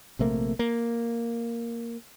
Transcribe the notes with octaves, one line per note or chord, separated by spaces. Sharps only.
A#1 C3 A3 A#3
A#3